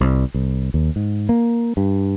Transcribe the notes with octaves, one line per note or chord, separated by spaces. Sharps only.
C2
C2
D#2
G#2
A#3
G2